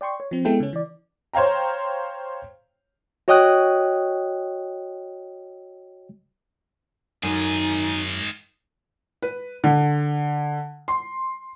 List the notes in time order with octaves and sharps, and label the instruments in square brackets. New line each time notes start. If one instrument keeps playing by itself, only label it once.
[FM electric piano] D5 G5 C6 C#6
C#5
F3 C4
G#3 B3 E4 A4 G5
C#3 C#4
E3 D5
[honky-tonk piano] C5 C#5 F5 G5 A#5
[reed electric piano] F#4 C#5 D#5 G5 D#6 F#6
[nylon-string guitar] F#2 [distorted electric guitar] D#3 G#4 [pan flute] D#4
[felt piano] B4
D3
C6